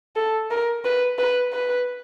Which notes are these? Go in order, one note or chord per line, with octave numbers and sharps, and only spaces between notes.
A4
A#4
B4
B4
B4